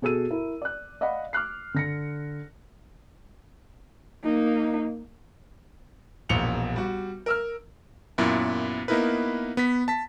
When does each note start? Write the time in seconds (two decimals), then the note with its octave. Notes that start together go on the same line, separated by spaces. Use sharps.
0.02 B2 F#4 G#4 A4 E6 D#7
0.31 E4 A#4
0.62 D5 F#6
1.01 D5 D#5 F5 F#5 B5
1.33 D6 F6 F#6 C7
1.74 D3 A#6 C#7
4.24 A#3 D#4
6.29 E1 A#1 C#7 F7 G7
6.76 G3 F#4
7.26 A#4 E6 F6
8.18 F#2 A#2 B3 E4 B4
8.88 A#3 B3 D#4 E4 A#4 B4
9.57 B3 B6
9.88 A5 B6